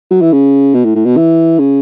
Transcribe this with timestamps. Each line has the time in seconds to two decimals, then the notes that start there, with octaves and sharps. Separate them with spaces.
0.10 F#3
0.21 E3
0.32 C#3
0.74 B2
0.84 A2
0.95 A2
1.05 B2
1.17 E3
1.59 C#3